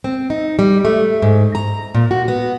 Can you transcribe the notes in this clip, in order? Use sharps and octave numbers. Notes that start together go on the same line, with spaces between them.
C4
D#4
G3
A3
G#2
A#5
A#2
F#4
B3